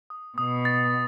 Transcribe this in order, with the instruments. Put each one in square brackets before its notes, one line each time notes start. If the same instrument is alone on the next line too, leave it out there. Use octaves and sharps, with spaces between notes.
[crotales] D#6
[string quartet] B2 [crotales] D#6
[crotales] A6